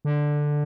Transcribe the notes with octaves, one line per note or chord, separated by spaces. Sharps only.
D3